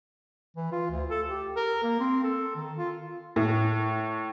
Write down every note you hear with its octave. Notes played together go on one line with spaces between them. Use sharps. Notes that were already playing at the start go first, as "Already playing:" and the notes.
E3
F4
D2
A4
G4
A#4
A#3
C4
A4
D#3
F4
A2